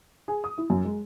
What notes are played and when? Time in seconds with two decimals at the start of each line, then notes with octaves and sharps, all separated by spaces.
0.28 G#4
0.44 D#6
0.58 E4
0.70 F#2
0.85 G#3